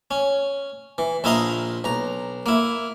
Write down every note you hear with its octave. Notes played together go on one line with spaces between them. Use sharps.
C#4
E3
A#1 E4 F4 D#5 A#5 C6
B1 A#5
A#3 E4